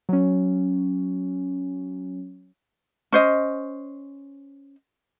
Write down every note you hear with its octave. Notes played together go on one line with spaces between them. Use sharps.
F#3 C#4
C#4 C5 D#5